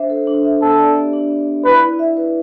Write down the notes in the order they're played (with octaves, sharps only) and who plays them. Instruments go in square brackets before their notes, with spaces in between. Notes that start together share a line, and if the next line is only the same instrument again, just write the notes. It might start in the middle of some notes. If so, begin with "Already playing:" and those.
Already playing: [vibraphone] D4 C5 E5
A4
D4
E5
[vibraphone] B3 [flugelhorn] A4
[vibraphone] D5
G4
D4
B3
D5
[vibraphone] E4 [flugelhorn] B4
[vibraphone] E4
E5
B4